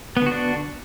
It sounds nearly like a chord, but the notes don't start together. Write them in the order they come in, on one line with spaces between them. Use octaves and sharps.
B3 D3 F#4 D4